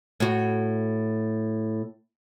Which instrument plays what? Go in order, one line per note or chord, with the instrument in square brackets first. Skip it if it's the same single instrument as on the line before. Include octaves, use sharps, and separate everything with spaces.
[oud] A2 F#4